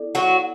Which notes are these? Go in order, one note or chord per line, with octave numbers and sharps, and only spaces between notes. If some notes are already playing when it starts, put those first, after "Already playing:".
Already playing: B3 E4 A4 D5
F#3 F#4